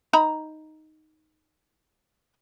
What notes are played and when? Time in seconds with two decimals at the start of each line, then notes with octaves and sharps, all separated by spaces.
0.13 D#4 A#5 B5